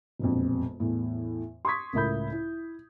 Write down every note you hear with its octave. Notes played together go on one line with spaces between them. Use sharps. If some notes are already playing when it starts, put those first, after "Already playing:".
E1 A#1 F2
E2 A2
C6 C#6 D#6 G#6 B6
C#2 A2 A#4 E5 B5 G6
E4